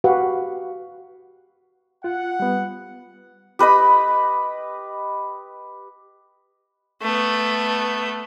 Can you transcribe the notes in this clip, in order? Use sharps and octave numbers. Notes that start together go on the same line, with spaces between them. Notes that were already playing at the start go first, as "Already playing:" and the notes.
F#4 G4 B4 F5 F#5
F4 F#5
G3 B3
G4 B4 D#5 B5
A3 B3